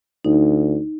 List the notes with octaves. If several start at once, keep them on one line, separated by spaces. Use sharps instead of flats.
D2 D#4